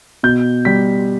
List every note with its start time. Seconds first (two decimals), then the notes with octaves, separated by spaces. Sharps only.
0.23 B2 G6
0.65 G3 B6